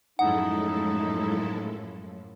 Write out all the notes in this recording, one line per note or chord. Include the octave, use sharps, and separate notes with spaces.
F#2 A2 F3 G#3 D#4 E4 A4 F#5